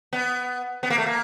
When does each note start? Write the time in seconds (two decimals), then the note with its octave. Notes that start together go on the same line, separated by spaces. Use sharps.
0.13 B3
0.83 B3
0.90 A#3
0.98 A3
1.06 A#3